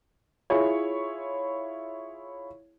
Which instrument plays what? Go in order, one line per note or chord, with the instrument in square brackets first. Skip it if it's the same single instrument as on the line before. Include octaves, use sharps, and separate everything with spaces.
[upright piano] E4 F4 G#4 C#5